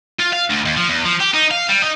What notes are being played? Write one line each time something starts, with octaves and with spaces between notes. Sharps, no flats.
F4
F5
D2
D#2
F3
E2
F3
G4
D#4
F5
G3
D#4